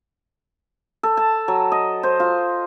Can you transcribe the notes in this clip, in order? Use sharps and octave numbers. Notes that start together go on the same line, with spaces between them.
A4
A5
F#3
D#5
C5
F4